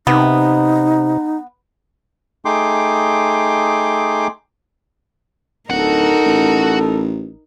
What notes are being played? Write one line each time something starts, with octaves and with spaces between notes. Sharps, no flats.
C3 B3 D#4
A3 D#4 G#4 G5 C6 D6
D1 D#4 F#4 A4 A#4 F#5
A1